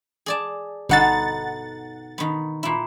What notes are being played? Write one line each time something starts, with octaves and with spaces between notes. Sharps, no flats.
G#4 D5 A5
G1 B2 D#4 A4 F#5 A6
D#3 B3
A#2 E4